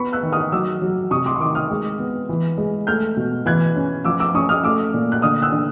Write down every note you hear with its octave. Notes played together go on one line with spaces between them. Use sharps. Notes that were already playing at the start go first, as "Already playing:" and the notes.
Already playing: B3 B5 C#6
E6 F#6
D#3
D#6 F6
F#3 D6 E6
F#3
C3 C#6 D#6
C6 D6
C#6
D#3 C6 D6
D#6 F6
G#3
B3
E3
G#3
A3 F6 G6
B2
E3 F#6 G#6
C#4
F3 D6 E6
D6 E6
C#4 C#6 D#6
D#6 F6
A3 D6 E6
A#2
F#6
D3 D#6 F6
E6 F#6
D3